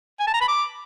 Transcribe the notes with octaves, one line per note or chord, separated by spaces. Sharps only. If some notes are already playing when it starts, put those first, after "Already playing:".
G#5
A5
A#5
B5
D6